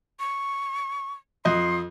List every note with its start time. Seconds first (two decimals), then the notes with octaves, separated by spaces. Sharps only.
0.20 C#6
1.45 F2 D#5 C6